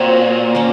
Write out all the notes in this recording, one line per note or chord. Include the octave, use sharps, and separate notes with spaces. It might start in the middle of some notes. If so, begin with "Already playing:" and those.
Already playing: A#2 C4 F#4 C#5
A#3 C#4